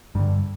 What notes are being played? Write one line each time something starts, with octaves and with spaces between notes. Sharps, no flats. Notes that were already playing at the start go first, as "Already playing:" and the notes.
G2 D3 G3